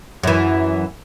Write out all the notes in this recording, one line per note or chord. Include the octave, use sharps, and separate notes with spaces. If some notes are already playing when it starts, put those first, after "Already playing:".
F#2 E3